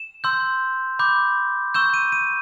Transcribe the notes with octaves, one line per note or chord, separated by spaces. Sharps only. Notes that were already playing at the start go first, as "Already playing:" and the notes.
Already playing: E7
C6 E6 G6
B5 D6 G6
C#6 E6 G6 E7
D#7
D#7